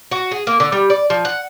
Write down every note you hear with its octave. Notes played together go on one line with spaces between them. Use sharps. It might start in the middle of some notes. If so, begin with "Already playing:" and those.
F#4
G#4
A#3
D3
G3
D5
F3
F#5